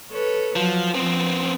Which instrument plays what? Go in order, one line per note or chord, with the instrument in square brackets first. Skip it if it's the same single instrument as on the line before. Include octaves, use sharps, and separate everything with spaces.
[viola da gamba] A4 B4 C#5
[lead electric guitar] F3 [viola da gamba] F#3
[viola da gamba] F3 [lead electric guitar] B3 C4